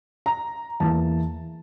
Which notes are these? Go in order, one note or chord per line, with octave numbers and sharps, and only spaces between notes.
A#5
E2 E3 A#3 E4 A5